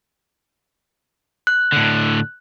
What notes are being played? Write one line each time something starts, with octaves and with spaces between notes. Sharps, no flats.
F#6
A2 D3